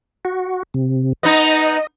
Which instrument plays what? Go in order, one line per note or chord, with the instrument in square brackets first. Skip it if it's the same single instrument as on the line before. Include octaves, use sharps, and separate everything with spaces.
[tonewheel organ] F#4
C3
[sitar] B3 D#4 [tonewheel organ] D#5